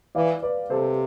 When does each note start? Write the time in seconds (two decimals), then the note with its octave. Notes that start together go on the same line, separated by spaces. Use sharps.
0.15 E3 D5 F5
0.43 B4 D5
0.70 C3 A4 C5